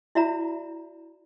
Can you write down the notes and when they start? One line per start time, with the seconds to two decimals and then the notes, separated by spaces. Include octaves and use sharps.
0.15 E4 F#4 D5 E5 A#5 B5